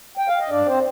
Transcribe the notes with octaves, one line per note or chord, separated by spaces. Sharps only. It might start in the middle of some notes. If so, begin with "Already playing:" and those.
G5
F5
D#5
G2 D4 D5
C4 C5